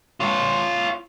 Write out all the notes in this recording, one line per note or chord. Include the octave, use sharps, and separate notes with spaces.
F4 C#5